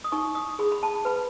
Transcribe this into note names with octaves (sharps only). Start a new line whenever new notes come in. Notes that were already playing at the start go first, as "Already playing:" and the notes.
D#6
D#4 C#6
D#6
G#4 B5
B5
A5
B4 B5